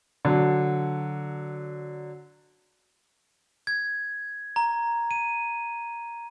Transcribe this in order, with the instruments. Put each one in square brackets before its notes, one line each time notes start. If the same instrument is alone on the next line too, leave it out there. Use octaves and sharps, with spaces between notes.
[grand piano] D3 F#3
[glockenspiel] G#6
A#5
D#7